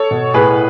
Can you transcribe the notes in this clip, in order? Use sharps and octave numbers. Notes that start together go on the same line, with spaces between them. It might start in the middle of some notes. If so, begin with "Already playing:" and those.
Already playing: A4 C#5
B2
A2 G#4 B4